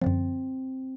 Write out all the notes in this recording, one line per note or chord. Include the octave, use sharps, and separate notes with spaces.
F#2 D3 F3 C4